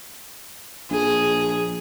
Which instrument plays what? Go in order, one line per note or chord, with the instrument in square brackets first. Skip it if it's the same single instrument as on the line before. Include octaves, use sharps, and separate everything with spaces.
[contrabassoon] A#1 [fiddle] G#4